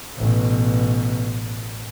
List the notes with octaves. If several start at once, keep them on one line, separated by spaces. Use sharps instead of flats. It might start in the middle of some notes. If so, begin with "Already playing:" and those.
A1 B2